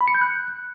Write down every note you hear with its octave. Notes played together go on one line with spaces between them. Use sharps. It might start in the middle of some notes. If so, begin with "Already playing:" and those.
B5
C#7
G6
F#6